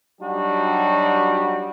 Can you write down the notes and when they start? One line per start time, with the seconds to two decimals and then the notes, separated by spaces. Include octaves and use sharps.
0.21 F#3 G3 D4 D#4 F#4 G4